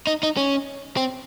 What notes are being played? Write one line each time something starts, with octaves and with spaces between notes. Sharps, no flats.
D#4
D#4
C#4
C4